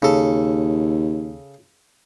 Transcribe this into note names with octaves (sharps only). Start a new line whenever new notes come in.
D#2 C#3 A4